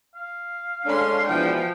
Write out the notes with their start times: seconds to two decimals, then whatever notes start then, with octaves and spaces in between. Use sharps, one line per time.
0.15 F5
0.86 G#3 C#4 D4 A4 C#5 C6
1.28 B2 E3 F3 G5